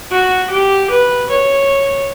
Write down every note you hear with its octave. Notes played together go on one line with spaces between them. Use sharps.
F#4
G4
B4
C#5